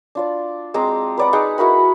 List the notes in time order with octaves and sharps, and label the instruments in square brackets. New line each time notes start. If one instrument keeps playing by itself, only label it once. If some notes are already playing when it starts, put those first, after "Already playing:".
[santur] D4 F4 D5
G#3 C4 A#5 D6
B4 D5 F#5
G#3 D#4 G#4 F#5
E4 F#4 A#4 B5